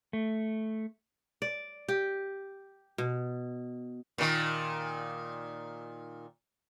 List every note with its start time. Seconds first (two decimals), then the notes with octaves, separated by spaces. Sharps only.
0.13 A3
1.42 D5
1.88 G4
2.98 B2
4.18 A#2 D#3